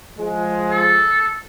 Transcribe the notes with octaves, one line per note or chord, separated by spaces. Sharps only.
F3 G#3
A4